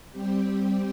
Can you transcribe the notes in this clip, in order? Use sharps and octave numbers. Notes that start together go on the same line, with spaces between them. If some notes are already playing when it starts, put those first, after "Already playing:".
G3 C4 G4